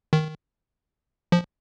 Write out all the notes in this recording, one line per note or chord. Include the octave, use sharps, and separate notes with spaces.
D#3
F3